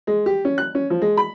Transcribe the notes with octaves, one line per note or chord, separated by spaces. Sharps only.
G#3
G4
C#4
F#6
C#4
F3
G#3
B5